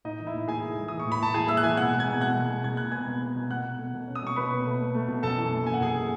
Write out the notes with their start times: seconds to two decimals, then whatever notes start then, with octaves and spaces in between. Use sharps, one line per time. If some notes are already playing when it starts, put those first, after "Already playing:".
0.05 A2 D#4 D#5
0.19 E3
0.27 E4 E5
0.34 A2
0.48 A2 G#4 G#5
0.63 E3
0.78 G#3
0.88 E3 D#6
1.00 C#6
1.05 A2
1.12 B5
1.21 A2 A5
1.34 E3 G#4 G#5
1.48 G#3 E5 E6
1.57 F#6
1.63 E3 G#5 G#6
1.77 B2 F#5 F#6
1.93 G#3
1.99 G#5 G#6
2.07 B2
2.21 B2 F#5 F#6
2.35 G#3
2.50 G#3
2.64 B2 G#6
2.77 B2 F#6
2.91 B3 G#5 G#6
3.07 B2
3.22 B3
3.36 B2
3.51 B2 F#5 F#6
3.64 B2
3.79 A3
3.94 B2
4.08 C#4
4.15 D#6
4.22 B2 C#6
4.36 B2 B4 B5
4.51 B2
4.66 A3
4.80 A3
4.95 A3
5.08 B2
5.23 F#2 A4 A5
5.37 E3
5.52 A3
5.66 F#2 G#5
5.74 F#5
5.81 F#2 G#4 G#5